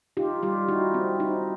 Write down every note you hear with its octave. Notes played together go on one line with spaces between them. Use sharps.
D#4 F4 G4
G3 F4 G4
D#4 E4 F#4
C4
D#4